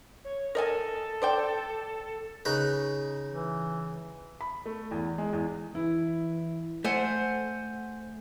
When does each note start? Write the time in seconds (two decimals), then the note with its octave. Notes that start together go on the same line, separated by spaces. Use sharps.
0.24 C#5
0.55 A4 A#4 D#5 G#5
1.22 C5 D5 G5
2.45 C#3 D#4 B4
3.30 E3
4.41 B5
4.66 A3
4.91 E2
5.18 G#3
5.33 E2
5.75 E3 E4
6.85 A3 C5 F#5 G#5